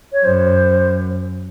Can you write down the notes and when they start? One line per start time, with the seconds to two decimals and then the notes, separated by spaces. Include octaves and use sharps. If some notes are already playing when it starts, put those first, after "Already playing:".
0.13 C#5
0.24 F#2 C5